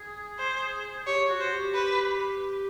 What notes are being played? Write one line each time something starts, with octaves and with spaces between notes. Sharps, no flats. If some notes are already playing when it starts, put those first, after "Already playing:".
Already playing: G#4
C5
G4 C#5
F#4
C5
G4
B4